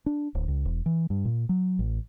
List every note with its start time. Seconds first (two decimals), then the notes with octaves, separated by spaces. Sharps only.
0.06 D4
0.35 D1
0.48 C#2
0.65 E1
0.86 E3
1.10 G2
1.25 A#2
1.49 F#3
1.79 A1